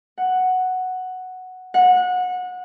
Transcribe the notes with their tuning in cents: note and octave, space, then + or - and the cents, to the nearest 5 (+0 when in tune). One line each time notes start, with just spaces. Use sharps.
F#5 +0
F#5 -25